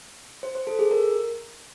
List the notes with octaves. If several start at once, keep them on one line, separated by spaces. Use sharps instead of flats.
C5
C5
A4
G#4
A#4